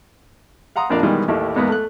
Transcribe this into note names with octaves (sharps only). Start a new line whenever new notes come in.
F5 F#5 A#5 C6 D#6
A#1 F2 D4 A#4 D5 F5
B2 D#3 E3 G3 G#3 B3
A1 D#2 A3 E4 G4
E2 G#2 A#3 B3
A3 F#6